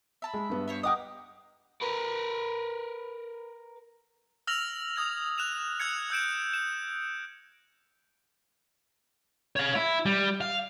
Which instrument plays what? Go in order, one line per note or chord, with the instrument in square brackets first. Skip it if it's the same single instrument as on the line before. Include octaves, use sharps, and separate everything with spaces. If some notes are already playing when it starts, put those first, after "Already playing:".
[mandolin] E5 A5 B5
[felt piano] G#3
G2 B3
[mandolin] C5 C#5 E5
[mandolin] A#4 D6 D#6 [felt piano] D#5 F#5 G5
[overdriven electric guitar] A#4 B4
[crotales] E6 F6 A#6 F7 F#7
D#6 G#6 F7
F#6 E7 F7
E6 F#6 G#6 C#7
E6 G6 D7 E7
E7
[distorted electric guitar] C#5 F5
E4
G3
F5